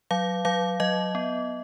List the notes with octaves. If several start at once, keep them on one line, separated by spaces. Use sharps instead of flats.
F#3 F5
F#3 F5
F#3 D#5
B3